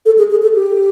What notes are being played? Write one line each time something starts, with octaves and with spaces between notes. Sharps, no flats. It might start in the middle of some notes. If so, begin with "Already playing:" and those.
A4
G#4
G#4
A4
G4